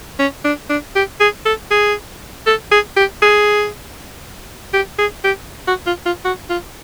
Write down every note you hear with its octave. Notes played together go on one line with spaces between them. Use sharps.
C#4
D4
D4
G4
G#4
A4
G#4
A4
G#4
G4
G#4
G4
G#4
G4
F#4
F4
F4
F#4
F4